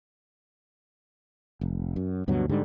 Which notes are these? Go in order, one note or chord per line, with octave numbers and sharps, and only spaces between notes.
F1
F#2
D2 G2 B2 F#3
G#2 D3 G3